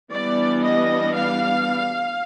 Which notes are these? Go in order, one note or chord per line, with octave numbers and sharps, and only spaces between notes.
E3 G3 B3 D4 D5
D#5
F5